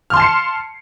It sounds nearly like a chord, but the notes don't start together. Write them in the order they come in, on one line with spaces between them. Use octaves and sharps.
F6 C6 A5 C7 C#7